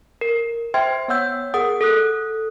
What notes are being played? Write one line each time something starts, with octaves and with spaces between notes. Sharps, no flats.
A#4
C5 E5 G5 C6 F6 G#6
B3 C#5 F#5 E6 G6
G#4 A#4 F#5 D#6
A4 D#6 F#6